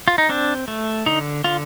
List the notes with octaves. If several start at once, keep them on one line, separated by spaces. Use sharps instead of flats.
F4
D#4
C4 D4
A3
D3 D#4
D3 F4